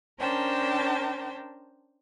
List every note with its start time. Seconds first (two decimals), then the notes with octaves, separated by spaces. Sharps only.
0.20 C#4 D4 A#4 C5 G5 A5